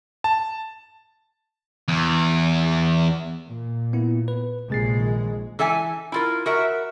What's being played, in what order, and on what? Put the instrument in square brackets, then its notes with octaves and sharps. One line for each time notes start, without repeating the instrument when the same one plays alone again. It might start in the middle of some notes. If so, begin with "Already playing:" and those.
[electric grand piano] A5
[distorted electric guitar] E2
[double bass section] A#2
[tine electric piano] B3 E4
B4
[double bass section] A#1 G#3 [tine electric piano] C3 A6 C7
[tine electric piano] D#3
[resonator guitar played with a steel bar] E3 A4 E5 G#5
E4 F4 A#4
F#4 A#4 E5